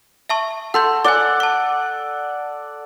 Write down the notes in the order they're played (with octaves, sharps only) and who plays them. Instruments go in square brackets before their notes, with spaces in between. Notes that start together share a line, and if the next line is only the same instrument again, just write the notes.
[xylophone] E5 A5 C#6
[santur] A4 [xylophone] F#5 C6 G6
[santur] D5 F#5 [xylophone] G#5 D6
[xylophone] A5 D6